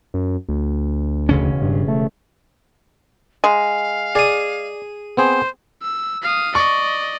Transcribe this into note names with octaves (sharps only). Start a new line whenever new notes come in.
F#2
D2
E1 C#3 C#4
G2
A3
G#3 F5
G#4 D5 D#6
B3 C4 G#4 C5
E6
F5 D#6
D5 D#5 C#6